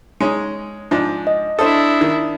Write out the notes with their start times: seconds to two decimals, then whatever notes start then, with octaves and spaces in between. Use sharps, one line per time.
0.20 G#3 C#4 D#4
0.91 G#2 F3 D4
1.27 D#5
1.59 D4 E4 A4 C5 D#6
2.01 D#3